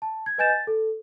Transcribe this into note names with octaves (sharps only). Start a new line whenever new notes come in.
A5
G#6
B4 D#5 G#5 G6 A6 E7
A6
A4